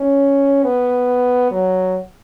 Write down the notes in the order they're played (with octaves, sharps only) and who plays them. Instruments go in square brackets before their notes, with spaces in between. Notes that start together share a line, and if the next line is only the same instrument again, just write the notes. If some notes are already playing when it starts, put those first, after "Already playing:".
Already playing: [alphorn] C#4
B3
F#3